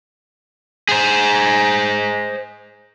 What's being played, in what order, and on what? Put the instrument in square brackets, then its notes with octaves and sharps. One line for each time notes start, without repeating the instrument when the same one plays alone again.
[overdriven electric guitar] G#4 C5